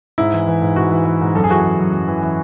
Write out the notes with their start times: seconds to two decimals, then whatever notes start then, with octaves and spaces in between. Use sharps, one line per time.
0.18 G#2 E4
0.33 E3
0.47 E3
0.62 G#2
0.76 G#2 F#4
0.91 E3
1.06 E3
1.21 G#2
1.35 F#2 A4
1.44 G#4
1.49 E3 F#4
1.60 E3 G#4
1.79 F#2
1.94 F#2
2.08 E3
2.23 E3